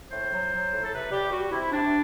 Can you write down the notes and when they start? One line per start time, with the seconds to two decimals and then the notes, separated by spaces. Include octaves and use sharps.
0.11 A2 C5
0.31 F#3
0.52 F#3
0.72 A2
0.83 A4
0.92 C3 B4
1.11 G3 G4
1.32 G3 F#4
1.52 C3 E4
1.72 C3 D4